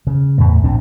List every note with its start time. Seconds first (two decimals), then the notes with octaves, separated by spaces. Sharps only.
0.07 C#3
0.38 E2 A2 A3
0.63 A#1 A2 C4 D4